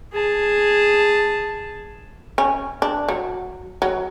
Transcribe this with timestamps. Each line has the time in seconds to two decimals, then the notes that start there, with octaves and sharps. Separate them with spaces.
0.13 G#4 A5
2.38 C#4
2.82 D4
3.09 F#3
3.82 F#3